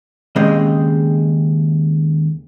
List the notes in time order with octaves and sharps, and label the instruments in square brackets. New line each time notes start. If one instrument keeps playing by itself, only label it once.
[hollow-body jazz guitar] D#2 C#3 G#3 C4 D#5